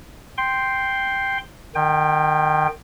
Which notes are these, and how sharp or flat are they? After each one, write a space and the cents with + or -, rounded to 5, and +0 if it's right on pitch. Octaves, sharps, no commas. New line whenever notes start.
G5 +0 C6 +0
D#3 -30 G5 +15